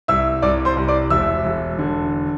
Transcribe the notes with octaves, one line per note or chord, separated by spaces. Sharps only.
C2 E5 E6
C2 D5 D6
C5 C6
C2
D5 D6
E1 E5 E6
E1
D3